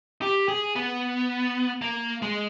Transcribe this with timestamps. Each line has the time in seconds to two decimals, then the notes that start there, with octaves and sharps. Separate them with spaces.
0.22 G4
0.49 G#4
0.76 B3
1.82 A#3
2.22 G#3